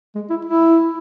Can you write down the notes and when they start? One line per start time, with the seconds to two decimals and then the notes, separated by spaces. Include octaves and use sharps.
0.15 G#3
0.30 E4
0.45 E4